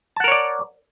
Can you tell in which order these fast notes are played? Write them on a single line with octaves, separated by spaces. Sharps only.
A5 F#5 A#4 C#5 D5